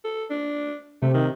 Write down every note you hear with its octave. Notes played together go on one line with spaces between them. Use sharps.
A4
D4
C3 A3
D#3